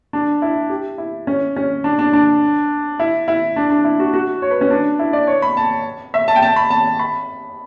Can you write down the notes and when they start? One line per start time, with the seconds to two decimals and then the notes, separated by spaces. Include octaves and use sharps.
0.13 D4
0.42 E4
0.69 G4
0.98 E4
1.27 C#4
1.56 C#4
1.84 D4
1.99 D4
2.13 D4
2.99 E4
3.28 E4
3.56 D4
3.70 D4
3.84 E4
4.00 F#4
4.13 F#4
4.42 C#5
4.51 B4
4.61 C#4
4.71 D4
4.99 E4
5.13 D5
5.27 C#5
5.42 B5
5.57 A5
6.14 E5
6.28 A5
6.36 G5
6.42 A5
6.56 B5
6.70 A5
6.99 B5